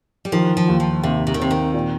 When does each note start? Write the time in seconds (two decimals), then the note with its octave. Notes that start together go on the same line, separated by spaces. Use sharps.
0.25 G3
0.32 D#3 F3
0.57 F3
0.68 D#2
0.80 F3
1.03 D#2 C3
1.27 C3
1.34 D#3
1.39 C3 C4
1.51 D#3
1.74 A#2